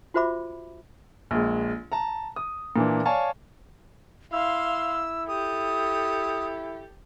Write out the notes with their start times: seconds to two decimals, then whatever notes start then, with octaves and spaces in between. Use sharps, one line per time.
0.14 F4 F#4 C5 E5 B5 D6
1.31 A#1 G#3
1.92 A5 A#5
2.36 D#6
2.76 A#2 E3 D4
3.06 C#5 D5 F5 G#5 A5
4.33 E4 F5 C6 E6
5.28 G4 A4 D#6